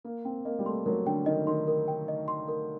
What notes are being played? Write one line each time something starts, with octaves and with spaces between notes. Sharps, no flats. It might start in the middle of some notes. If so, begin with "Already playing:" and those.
A#3 A#4
C4 G5
A#3 D#5
G3
A3 C6
F#3 A#4
D3 G5
D#3 D#5
D#3 C6
A#4
G5
D#5
C6
A#4